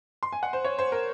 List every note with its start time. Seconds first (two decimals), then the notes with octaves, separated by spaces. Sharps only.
0.23 C6
0.33 G#5
0.43 F#5
0.53 C5
0.65 C#5
0.79 C5
0.92 A#4